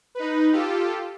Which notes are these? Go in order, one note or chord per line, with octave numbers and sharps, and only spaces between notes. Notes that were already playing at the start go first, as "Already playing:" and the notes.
D#4 B4
F4 G4 A4